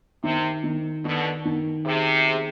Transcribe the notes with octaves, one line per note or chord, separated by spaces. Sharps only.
C3 D#3
D#3
B2 D3 D#3
D#3
C3 G#4
G#4